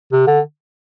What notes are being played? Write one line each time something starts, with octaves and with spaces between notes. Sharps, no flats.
C3
D3